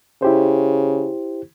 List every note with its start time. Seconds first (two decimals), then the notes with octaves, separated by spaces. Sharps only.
0.22 C#3 E4 G4 C5